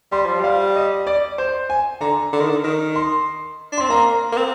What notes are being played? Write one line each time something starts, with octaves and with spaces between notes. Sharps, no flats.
G3 C6
F3
G3 F5
D#5
D5
C5
G#5
D3 A#5
D3
D#3
D3
D#3
C6
D4
C4 C6
A#3 A#5
A#3
C4